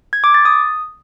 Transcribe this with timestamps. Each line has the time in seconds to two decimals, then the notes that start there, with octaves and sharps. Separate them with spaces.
0.13 G#6
0.24 D6
0.34 A6
0.45 D#6